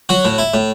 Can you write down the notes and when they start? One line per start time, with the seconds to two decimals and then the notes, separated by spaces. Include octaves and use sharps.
0.09 F#3 F#4
0.25 A2
0.38 E4
0.54 A2